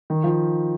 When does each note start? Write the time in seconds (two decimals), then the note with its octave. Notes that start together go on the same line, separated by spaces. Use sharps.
0.10 D#3
0.24 F3